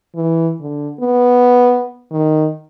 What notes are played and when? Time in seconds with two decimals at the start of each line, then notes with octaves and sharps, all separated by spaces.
0.15 E3
0.60 D3
1.00 B3
2.12 D#3